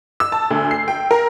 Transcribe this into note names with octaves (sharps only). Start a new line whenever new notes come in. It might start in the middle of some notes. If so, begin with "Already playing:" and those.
E6
A5
D2
C7
G5
A#4